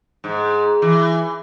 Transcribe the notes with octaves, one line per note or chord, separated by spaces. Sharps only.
G#2
E3